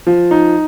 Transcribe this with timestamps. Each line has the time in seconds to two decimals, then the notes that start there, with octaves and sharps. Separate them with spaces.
0.07 F3
0.31 D#4